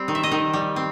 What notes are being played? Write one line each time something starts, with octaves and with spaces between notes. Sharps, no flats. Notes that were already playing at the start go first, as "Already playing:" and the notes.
Already playing: G3 C4
D#3
E5
D#5
D#3
G3
C4